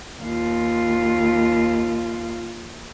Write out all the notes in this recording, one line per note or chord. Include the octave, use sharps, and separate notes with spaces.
D#2 F4